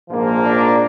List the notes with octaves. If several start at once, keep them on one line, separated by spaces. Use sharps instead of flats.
A#1 G#2 F3 A#3
D4